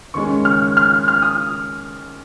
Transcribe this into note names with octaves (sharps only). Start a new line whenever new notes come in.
D#2 C#3 G#3 C#4 C#6
F6
F6
F6
D#6